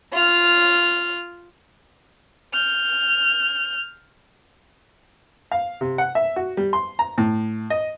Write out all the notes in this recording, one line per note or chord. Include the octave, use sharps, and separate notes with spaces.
F4 F6
F6 G6
F5
C3
F#5
E5
F#4
G3
C6
A#5
A2
D#5